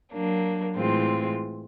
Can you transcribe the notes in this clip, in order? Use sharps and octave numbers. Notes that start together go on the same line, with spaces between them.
F#3 A#3 D4
A2 E3 G#3 C4 F4